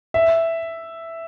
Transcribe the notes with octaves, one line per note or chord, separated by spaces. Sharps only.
E5